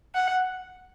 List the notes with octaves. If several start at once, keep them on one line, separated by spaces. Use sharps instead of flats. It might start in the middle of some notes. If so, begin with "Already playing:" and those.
F#5